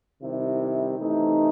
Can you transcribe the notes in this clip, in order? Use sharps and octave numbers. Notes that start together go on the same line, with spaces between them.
C3 D#3 G3 E4
C3 E3 A3 D#4